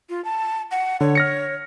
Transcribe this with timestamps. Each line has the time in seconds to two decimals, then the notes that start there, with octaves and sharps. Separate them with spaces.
0.09 F4
0.25 A5
0.71 F#5
1.01 D3 C#5
1.15 F6 A#6 C#7